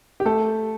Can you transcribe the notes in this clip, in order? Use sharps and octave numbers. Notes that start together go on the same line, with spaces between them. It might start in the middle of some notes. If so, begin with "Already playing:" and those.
G4
A3 A4